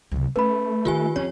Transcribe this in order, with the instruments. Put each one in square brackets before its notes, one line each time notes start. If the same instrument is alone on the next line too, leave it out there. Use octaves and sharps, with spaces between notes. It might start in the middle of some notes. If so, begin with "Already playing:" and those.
[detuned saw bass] C#2 [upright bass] C3 F#3
[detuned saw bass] A3 [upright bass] C#4 [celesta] B4 B5
[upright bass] D#3 D#4 [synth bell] F4 G4 G#5
[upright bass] F2 [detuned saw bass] C#4 [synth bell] C#5